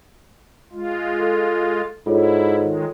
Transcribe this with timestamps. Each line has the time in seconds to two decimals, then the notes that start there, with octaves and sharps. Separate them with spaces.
0.73 G#3 F4
1.19 A4
2.07 G#2 E4 F4 A4 C#5
2.57 D#3 G#3